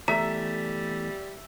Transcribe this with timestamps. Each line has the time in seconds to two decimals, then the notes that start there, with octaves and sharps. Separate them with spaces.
0.08 E2 G3 A3 E5 A#5